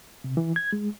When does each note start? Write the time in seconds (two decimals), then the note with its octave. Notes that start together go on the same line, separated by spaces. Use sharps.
0.24 C3
0.37 E3
0.56 G#6
0.73 G#3